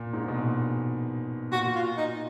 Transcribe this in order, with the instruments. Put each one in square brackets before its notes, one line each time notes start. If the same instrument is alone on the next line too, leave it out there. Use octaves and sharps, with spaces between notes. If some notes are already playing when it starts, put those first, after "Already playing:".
Already playing: [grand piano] A#2
G#2
B2
A#2
[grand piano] A#2 [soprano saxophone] F#4
[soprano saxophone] F4
D#4